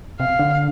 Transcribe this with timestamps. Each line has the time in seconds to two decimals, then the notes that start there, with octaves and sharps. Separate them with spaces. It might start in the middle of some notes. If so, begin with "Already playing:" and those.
0.19 C3 F5
0.39 D3